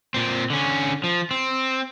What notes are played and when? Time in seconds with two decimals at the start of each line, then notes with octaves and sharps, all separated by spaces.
0.14 A#2 C4
0.50 D3 C#4
1.04 F3
1.31 C4